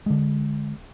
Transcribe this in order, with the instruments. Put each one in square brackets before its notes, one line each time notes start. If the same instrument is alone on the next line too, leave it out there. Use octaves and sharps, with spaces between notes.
[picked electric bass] D3 G#3